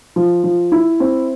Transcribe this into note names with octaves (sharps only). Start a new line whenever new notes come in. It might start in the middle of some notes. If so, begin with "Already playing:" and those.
F3
F3
E4
C4